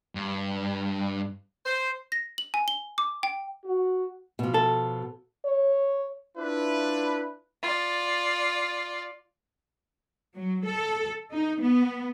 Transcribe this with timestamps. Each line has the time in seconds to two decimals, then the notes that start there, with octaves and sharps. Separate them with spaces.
0.15 G2
1.66 C5
2.12 A#6
2.38 F#7
2.54 G#5
2.68 G7
2.98 D6
3.23 G5
3.64 F#4
4.39 B2 F3
4.54 A4
5.45 C#5
6.38 D4 E4 F4 B4
7.63 F4 D5
10.34 F#3
10.64 A4
11.32 D#4
11.61 B3